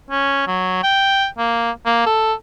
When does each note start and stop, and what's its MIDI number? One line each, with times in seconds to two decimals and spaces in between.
0.10 0.43 61
0.47 0.81 54
0.83 1.27 79
1.38 1.71 58
1.86 2.02 58
2.06 2.33 69